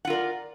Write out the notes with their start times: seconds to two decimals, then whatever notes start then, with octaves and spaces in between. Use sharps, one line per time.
0.05 F#5
0.07 F4
0.10 A#4
0.13 D5